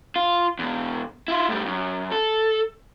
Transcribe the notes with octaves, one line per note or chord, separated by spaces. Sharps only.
F4
E2 B2
E4 F4
A2 G3
F#2
A4